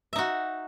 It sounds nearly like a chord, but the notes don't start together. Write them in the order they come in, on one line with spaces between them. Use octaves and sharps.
E5 D#4 F#4